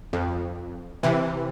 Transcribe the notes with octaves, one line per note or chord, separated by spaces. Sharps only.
F2
C3 E3